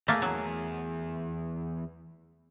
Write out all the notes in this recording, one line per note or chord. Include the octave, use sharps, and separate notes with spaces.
E2 A3 A#3 G#4
F#3